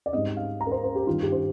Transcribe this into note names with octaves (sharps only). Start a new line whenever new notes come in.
D5
G#2 G3 C4 D#5
F5
A#5
A#4
C5
C5
G4
G2 D#3 G3 F4
G4
C5